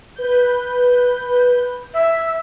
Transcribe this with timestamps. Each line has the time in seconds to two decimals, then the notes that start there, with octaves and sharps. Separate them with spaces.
0.15 B4 G6
1.94 E5